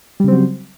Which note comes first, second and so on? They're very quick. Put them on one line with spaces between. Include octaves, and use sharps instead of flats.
G3 C#3 C4 F#3